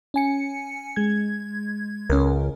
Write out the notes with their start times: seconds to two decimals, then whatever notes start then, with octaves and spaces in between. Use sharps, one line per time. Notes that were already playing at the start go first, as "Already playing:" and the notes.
0.14 C#4 G#5 C#7
0.96 G#3 G#6
2.10 C#2 C#4 A#4